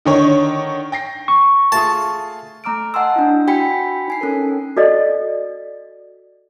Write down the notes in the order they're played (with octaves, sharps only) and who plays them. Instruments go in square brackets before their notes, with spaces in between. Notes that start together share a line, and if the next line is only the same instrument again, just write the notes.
[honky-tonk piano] D3 D#3 C#5
[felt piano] G5 A#6 C7
[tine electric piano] C#6
[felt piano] A3 F4 G#4 [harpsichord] A5
[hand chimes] A3 A#5 D6 F6 D7
D#5 F#5 G#5 A5 C6 E6
D4 E4
F#4 G5 G#5 B5 B6 C#7
D#4 G#5 C7
C#4 A4 A#4
[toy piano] F#4 A4 D5 D#5